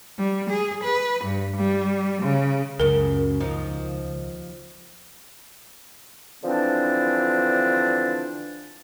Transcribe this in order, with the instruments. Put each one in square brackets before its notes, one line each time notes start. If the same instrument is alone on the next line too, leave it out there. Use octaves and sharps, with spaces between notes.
[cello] G3
G#4
B4
G2
G3
C#3
[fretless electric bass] C#2 [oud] F#2 C#3 [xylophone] A#4
[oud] D#2 F3 D#4
[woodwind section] D3 E3 F3 C4 D4